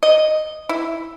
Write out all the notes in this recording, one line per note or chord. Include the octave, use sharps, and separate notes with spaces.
D#5
E4